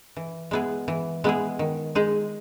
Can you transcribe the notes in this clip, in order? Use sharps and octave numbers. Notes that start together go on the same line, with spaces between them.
E3
G#3 B3 E4 G#4
E3
G#3 B3 E4 G#4
D#3
G#3 D#4 G#4